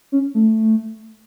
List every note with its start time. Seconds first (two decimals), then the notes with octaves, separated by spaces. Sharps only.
0.12 C#4
0.34 A3